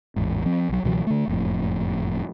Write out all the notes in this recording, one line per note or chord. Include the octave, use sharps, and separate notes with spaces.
A1 E2 G#2
F3 C4
B1 F#3
C#2 B2 E3 F#3
D3 A3
F#1 F2 A2